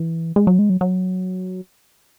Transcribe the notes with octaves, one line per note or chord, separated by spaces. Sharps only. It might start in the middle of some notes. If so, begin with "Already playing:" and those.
Already playing: E3
G#3
F#3
G#3
F#3
F#3